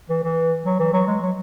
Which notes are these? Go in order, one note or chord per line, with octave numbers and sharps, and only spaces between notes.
E3
E3
F#3
E3
F#3
G#3
F#3